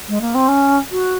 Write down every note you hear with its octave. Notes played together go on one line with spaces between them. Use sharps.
G#3
A#3
C4
C#4
F#4